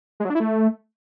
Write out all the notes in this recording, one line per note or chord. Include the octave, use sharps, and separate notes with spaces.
G#3
F#3
D4
E4
A3